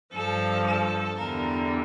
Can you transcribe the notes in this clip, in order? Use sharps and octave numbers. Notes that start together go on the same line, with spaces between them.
G2 F3 A4
A4
E2 D3 G3 A#4